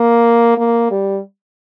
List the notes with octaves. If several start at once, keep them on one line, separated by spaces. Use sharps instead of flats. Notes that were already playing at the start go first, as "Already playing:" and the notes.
Already playing: A#3
A#3
G3